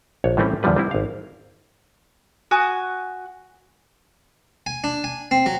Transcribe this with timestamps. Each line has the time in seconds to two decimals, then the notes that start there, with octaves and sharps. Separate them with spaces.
0.24 A#1 C#5
0.37 A2 E3 G3 A3 C4 C#4
0.63 E2 D3 F3 G3 B4
0.76 G3 C4 E4
0.91 G#1 F5
2.51 F#4 G#5 D#6
4.66 G#5
4.84 D4
5.04 G#5
5.31 C4
5.46 F#3